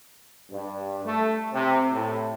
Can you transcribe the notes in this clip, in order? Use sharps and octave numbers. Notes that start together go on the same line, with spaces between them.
G2
A3
C3
A2